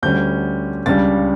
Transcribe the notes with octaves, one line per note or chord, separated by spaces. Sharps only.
D2 D3 G3 C#4 G6
C#2 C#3 G3 D4 A6